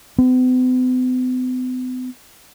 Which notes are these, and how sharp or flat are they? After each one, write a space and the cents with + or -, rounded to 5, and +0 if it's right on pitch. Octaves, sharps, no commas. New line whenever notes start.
B3 +45